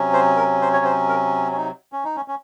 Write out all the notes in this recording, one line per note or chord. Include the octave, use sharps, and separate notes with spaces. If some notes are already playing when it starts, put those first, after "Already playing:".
Already playing: C3 F#3 C#4
C5
A#4
C5
C#5
C5
A#4
C#4
D#4
C#4
D#4
C#4
C#4